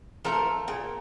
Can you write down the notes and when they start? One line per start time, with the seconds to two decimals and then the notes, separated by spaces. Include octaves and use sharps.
0.25 F3 A3 A#4
0.68 A#2 G#4